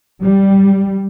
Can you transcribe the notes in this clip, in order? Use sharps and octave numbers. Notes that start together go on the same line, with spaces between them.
G3